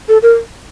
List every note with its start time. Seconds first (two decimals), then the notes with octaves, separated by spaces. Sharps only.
0.09 A4
0.23 A#4